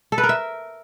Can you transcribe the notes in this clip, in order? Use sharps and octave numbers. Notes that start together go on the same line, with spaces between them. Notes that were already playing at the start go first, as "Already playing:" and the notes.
A4
B4
A#4
E5